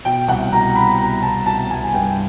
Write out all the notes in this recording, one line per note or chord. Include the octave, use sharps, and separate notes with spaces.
B2 G5
C2 F#5
B2 A#5
C2 B5
B2 A#5
C2 A5
B2 A5
C2 G#5
G2 G5